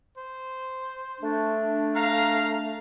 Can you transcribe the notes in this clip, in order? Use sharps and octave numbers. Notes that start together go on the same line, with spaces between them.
C5
A3 D4
F5 A#5